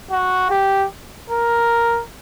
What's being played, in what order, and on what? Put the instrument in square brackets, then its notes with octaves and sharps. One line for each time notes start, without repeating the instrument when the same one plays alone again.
[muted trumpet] F#4
G4
A#4